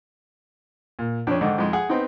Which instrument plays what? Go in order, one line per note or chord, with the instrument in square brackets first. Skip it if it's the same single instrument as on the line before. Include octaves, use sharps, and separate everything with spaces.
[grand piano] A#2
[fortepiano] F2 C#4 [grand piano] D4
[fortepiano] G#2 D3 D#3 [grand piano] D#4
[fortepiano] F2 G#3
[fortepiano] G#4 [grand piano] F#5
[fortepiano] B3 C4 D#4